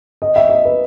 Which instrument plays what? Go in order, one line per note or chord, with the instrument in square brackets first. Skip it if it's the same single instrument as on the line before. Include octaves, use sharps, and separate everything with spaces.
[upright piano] D#5
E5
D#5
B4